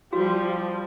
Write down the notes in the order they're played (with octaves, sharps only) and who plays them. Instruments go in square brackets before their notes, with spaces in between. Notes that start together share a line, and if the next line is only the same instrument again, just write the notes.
[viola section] F3 [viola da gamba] G3 [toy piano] F#4